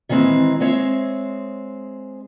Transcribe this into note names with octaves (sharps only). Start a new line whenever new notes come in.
D#3 E3 G#3 C4
G#3 C4 C#5 E5